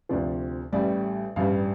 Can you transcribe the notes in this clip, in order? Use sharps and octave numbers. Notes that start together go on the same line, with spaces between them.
D2 C3 F3 D5
A1 A2 G3 D5
A1 G2 G3 F5